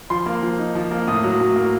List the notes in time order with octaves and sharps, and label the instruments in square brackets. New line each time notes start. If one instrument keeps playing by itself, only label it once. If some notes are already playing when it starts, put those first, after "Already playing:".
[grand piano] F3 C6
A#3
F3
D#4
F3
A#3
A2 D#6
F#3
A2
A#3